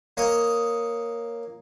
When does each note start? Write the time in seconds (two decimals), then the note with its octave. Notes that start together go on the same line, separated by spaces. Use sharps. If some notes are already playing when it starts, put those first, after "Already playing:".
0.17 A#3 C#5 D#5 D#6